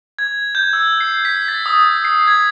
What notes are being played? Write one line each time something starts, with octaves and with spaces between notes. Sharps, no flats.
G#6
G6
E6
C7
B6
A6
D#6
C7
G#6